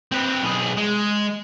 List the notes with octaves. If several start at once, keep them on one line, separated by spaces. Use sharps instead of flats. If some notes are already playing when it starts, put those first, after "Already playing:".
C4 B4
B1 G#4
G#3